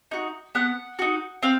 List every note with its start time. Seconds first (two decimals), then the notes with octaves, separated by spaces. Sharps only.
0.11 D#4 F#4
0.55 B3 F#5
0.99 D#4 F#4
1.43 C4 F5